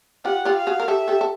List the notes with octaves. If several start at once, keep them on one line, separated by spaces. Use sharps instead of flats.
F4 G4 F#5
F4 G4
F5
F#4 G#4
A#4
G4 A4 E5
G4 A4
A4